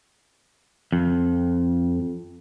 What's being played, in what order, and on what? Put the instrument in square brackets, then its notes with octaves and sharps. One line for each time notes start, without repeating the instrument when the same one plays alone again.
[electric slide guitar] F2